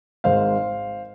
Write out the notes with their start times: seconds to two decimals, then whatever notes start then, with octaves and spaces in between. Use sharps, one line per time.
0.24 G#1 G#2 G#3 C5 F5